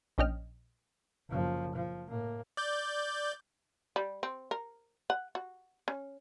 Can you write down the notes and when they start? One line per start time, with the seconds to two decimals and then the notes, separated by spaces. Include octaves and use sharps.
0.18 A#1 C#4 D4 D#5 G5 F6
1.29 F#1 F3
1.75 F3
2.08 A2 A#3
2.57 D5 G6
3.96 G3
4.23 C4
4.51 A#4
5.10 F#5
5.35 F#4
5.88 C#4